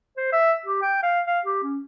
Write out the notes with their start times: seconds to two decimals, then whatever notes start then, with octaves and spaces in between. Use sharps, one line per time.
0.17 C5
0.32 E5
0.66 G4
0.82 G5
1.03 F5
1.27 F5
1.45 G4
1.63 C#4